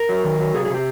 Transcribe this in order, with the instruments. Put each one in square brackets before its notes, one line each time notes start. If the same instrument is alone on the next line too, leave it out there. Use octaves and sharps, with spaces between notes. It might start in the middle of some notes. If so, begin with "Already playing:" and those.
Already playing: [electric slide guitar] A#4
F#3
D#3
F#3
C3 G#4
G#4
C3 G4